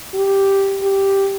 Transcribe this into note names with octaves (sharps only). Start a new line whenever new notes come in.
G4
G4